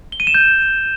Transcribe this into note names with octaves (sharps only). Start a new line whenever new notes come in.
G7
D#7
E7
G6